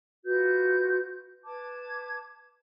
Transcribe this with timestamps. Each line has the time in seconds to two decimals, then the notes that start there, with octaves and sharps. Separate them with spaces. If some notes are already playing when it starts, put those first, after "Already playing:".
0.24 F4 F#4 B4 G6
1.44 B4 A5 D6 G#6